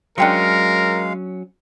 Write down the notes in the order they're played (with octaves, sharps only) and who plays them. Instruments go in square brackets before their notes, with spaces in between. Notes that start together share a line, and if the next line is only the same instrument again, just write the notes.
[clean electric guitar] F#3 C#4 [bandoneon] G#3 F5 [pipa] D4 G5 C6 [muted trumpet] A#4